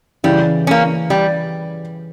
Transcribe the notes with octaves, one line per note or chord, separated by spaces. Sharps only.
C#3 E3 G3
A#3 C#4
G3